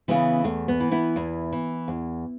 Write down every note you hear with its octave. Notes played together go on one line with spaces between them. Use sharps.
C#3 E3 B3
E2 A3
B3
E3
B3 E4
E2
E3
E2